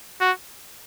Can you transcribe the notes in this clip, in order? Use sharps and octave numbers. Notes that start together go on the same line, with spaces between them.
F#4